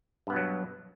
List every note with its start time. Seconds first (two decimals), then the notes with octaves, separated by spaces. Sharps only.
0.27 G2
0.30 B3
0.33 B2
0.36 F#3